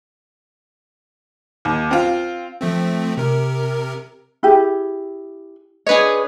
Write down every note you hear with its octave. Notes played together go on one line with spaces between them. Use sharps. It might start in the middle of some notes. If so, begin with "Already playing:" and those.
D#2
C4 F4
F3 A3 C4
C3 A#4
E4 G4 G#4
D4 G#4 B4 C#5 D#5